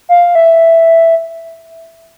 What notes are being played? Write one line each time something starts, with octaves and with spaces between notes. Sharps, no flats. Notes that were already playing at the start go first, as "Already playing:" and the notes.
F5
E5